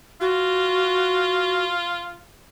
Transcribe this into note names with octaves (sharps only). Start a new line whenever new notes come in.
F4 F#4